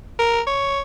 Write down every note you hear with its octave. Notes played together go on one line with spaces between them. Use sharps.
A#4
C#5